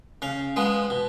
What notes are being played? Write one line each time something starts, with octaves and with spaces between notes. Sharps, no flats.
C#3 F5
F3 G#3 B3
B2